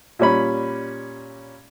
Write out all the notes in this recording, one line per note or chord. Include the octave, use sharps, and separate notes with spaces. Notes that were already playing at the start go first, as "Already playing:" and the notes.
A#2 G3 C#4 B5